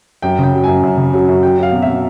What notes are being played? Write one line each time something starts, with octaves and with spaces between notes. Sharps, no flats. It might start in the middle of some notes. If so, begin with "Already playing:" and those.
F#2 G5
C#3
G5
F#3
F#2 G#5
F#2
C#3
F#3
F#2
F#3 G5
F#3 F5
B2
E5
B2